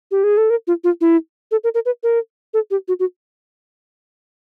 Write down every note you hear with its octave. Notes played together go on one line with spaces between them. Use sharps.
G4
G#4
A4
A#4
F4
F4
E4
A4
A#4
A#4
B4
A#4
A4
G4
F#4
F#4